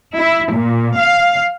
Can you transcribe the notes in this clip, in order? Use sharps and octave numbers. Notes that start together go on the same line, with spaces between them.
E4
A#2
F5